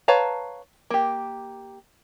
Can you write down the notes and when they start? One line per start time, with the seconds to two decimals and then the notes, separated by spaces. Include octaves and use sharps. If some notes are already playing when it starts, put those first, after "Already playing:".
0.08 B4 C#5 F5 A5 A#5
0.91 A#3 G4